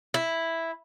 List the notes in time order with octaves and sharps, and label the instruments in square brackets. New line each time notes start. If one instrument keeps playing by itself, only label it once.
[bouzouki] E4